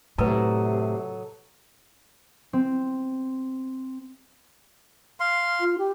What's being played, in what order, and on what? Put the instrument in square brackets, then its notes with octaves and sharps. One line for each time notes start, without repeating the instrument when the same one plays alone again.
[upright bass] A2 [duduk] C3 [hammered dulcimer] F#3 A4 D#5 [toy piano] B4 A5
[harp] C4
[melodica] F5 C6
[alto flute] F4
G4